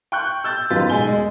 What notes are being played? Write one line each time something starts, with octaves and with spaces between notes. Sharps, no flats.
G5 C#6 F#6 G6
E6 G6 A6
F#2 D#3 B3 F4 A6 B6
E1 G#3 D#4 G#5 G7
G#3